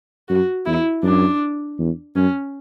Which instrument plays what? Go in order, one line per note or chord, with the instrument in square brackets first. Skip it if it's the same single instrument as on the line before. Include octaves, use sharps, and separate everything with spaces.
[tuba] F#2 [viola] F#4
[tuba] E2 [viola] E4
[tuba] F#2 [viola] D4
[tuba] E2
[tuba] F#2 [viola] C#4